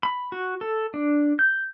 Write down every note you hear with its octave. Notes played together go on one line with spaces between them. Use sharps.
B5
F#4
A4
D4
G6